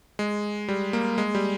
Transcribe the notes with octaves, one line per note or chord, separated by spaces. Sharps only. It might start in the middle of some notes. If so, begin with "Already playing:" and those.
G#3
G3
A#3
G#3
G3